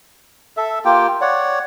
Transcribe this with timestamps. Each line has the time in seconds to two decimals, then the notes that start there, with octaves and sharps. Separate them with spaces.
0.57 A4 E5
0.85 A#3 F4 G4 G5
1.21 C#5 D5 F#5